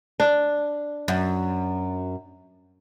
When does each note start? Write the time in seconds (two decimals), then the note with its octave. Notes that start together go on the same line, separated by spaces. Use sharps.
0.20 D4
1.08 F#2